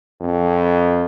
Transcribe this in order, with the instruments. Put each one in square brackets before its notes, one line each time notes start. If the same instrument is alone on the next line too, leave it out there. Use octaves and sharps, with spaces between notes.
[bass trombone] F2